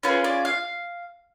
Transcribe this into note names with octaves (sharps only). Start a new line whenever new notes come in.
C#4 F4 G#4 B4
D5
F5